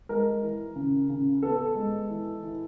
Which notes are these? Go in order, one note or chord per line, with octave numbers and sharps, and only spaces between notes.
G#3 A#4
E3
C#3
C#3
B3 A4
G#3
E3
E3